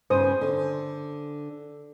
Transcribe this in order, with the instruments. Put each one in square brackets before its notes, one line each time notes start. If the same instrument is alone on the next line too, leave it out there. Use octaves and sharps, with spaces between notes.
[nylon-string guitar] G2 C#3 B3 [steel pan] C5 D#6
[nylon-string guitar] D3